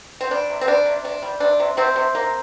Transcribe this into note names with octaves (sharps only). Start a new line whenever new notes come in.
C4
G3 D4
C3
C4
G3 D4
C3
C3 D4
G3
C3 D4
C3
C3 C4
C3
A#3